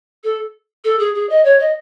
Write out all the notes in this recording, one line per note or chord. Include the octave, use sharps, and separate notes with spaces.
A4
A4
G#4
G#4
D#5
C#5
D#5